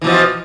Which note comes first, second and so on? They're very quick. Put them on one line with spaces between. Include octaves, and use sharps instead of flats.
E3 B2 F3